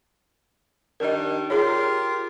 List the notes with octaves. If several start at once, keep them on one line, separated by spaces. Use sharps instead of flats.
D#3 G3 D4 A#4 D#5
F4 G4 G#4 A#4 C#5